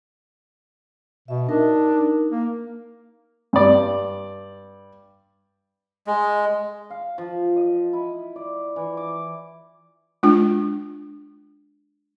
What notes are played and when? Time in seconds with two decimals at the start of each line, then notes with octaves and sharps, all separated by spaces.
1.28 B2 D#5 E5
1.49 D4 D#4 A#4
2.32 A#3
3.53 G2 D5
6.07 G#3
6.90 F5
7.18 F3
7.56 D#5
7.93 E4
8.36 D5
8.76 E3
8.97 D6
10.23 G#3 D4 F4